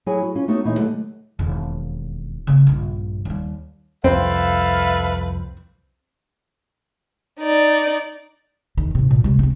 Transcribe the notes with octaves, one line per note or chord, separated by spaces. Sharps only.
F#3 E4 G#4 C#5 G#5
F#4
C#4 F4
A3 B3 D#4 F#4 C#5
D2 A#2 E3 D#4 E4 C#5
D3 F#3 A3 G4 B4
E1 D#2
C#3 A#3
A#1 G2
D#2 G3
C2 F2 C4 A4 B4 E5 F5
D#4 D5
E2 D#3
G#2 C3
A#2 D3
C3 G#3
B3 C4